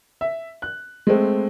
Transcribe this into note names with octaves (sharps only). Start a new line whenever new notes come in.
E5
F#6
G#3 A3 C4